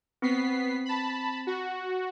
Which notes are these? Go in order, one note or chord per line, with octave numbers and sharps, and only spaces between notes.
B3 C4 B6 C7
A5 B5
F#4